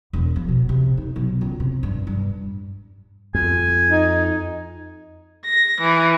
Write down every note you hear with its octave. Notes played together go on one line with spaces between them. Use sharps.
E1
F3
B2
C3
D#4
B1
C#2
C3
G2
G2
F2 G#5
D#4
A#6
E3